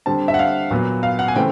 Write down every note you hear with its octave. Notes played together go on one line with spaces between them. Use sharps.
D3 G3 C4 A5
E5
F#5
F5
A#2 F#3 B3
F5
F#5
G#5
C#3 E3 A3 C4 G5